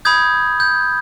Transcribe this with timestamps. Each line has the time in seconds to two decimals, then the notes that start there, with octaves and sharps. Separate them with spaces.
0.05 B5 D#6 G6 G#6
0.60 G6